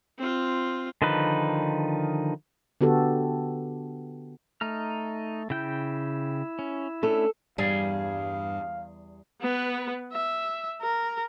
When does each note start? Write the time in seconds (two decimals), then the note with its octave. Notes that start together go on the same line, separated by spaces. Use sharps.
0.18 C4 F4
1.02 D3 D#3 F3 D#4 B4
2.81 D3 B3 F#4 G4 A4
4.61 A3 D#4 A#5 F6
5.50 C#3 E4 G5 G6
6.59 C#4
7.03 A3 C#4 D4 A4
7.58 E2 G2 G3 G#4 F5
9.41 B3 B4
10.12 E5
10.82 A#4